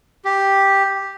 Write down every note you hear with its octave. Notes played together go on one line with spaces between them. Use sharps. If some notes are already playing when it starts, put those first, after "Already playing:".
G4